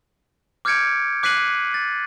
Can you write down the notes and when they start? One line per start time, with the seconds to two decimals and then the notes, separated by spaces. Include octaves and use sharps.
0.65 D6 F6 G6 G#6 C#7 D7
1.23 D6 F#6 B6 C7 D#7 F#7
1.74 A6